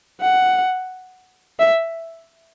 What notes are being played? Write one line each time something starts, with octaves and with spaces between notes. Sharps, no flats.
F#5
E5